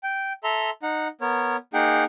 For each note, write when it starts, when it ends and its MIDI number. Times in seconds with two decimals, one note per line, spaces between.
0.03 0.33 79
0.44 0.70 69
0.44 0.70 76
0.44 0.70 82
0.44 0.70 84
0.83 1.08 63
0.83 1.08 78
1.21 1.57 59
1.21 1.57 70
1.21 1.57 73
1.74 2.04 58
1.74 2.04 63
1.74 2.04 68
1.74 2.04 78
1.74 2.04 79